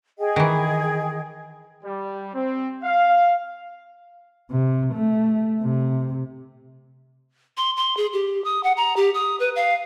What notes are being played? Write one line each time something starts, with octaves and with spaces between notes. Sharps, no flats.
G#4 D#5 G5
D#3 E3
G3
C4
F5
C3
A3
C3
C6
C6
G#4
G4
D#6
F#5
A#5
G4
D#6
B4
F5